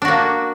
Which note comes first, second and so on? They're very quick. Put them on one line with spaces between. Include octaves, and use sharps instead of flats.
D4 F#4 A#3